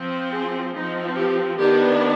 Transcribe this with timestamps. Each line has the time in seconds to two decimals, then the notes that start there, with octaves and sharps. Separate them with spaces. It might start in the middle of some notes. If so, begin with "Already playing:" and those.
Already playing: F3 C4
0.32 G#4
0.74 F3 C4 D#4
1.16 G4
1.58 D#3 B3 D4 G4